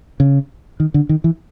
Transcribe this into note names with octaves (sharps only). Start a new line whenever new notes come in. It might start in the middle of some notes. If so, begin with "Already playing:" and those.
C#3
D#3
D3
D#3
E3